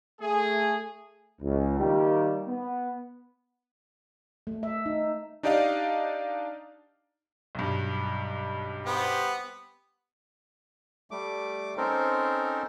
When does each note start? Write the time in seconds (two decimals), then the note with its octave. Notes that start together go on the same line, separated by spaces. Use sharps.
0.21 A3 G#4
1.41 C#2
1.79 D#3 G3 A#3 D#4 G4
2.48 B3
4.47 A3
4.63 E5
4.86 D#4
5.43 D4 D#4 G4 D5 D#5 F5
7.55 B1 G2
8.86 B3 G4 C5
11.11 G3 A3 D6
11.77 C4 C#4 D#4 A4 A#4 C5